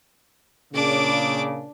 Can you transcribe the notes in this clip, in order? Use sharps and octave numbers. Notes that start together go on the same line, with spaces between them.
A#2 C#3 D4 D6